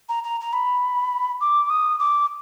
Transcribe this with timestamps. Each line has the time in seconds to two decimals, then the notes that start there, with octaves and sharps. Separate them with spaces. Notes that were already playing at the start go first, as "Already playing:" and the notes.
0.09 A#5
0.24 A#5
0.41 A#5
0.53 B5
1.41 D6
1.70 D#6
1.99 D6